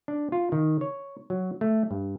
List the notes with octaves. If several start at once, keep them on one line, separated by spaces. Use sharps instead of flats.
D4
F4
D#3
C#5
F#3
A3
G2